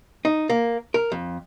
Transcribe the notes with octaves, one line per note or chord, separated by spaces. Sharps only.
D#4
A#3
A#4
F2